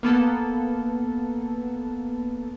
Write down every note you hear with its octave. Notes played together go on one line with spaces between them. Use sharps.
A#3 B3 A4